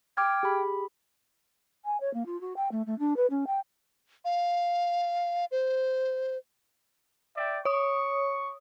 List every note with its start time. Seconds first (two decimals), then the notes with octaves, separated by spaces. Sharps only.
0.17 G5 D6 F6 G#6
0.43 G4 G#4 B5
1.85 G#5
2.00 C#5
2.14 A#3
2.26 F4
2.41 F#4
2.56 G5
2.71 A3
2.86 A3
2.99 D4
3.16 B4
3.30 C#4
3.47 G5
4.25 F5
5.51 C5
7.36 D5 E5 G5
7.65 C#5 C#6 D#6